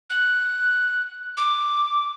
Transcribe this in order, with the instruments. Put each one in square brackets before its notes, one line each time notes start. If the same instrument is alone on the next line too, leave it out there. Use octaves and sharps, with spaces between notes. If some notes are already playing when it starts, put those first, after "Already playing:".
[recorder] F#6
D6